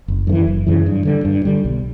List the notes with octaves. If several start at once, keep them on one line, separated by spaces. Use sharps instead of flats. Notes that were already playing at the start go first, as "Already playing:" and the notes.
F#1
F#2 C#3
E3
F#1
F#2 C#3 E3
G2
D3 G3
G2
D3 G3
B1